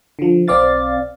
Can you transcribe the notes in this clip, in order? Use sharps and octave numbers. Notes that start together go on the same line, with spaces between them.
D3 F3
B1 C4 D5 F5 A6